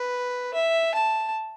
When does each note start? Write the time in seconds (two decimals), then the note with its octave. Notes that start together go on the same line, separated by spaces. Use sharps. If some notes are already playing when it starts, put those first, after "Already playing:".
Already playing: B4
0.54 E5
0.95 A5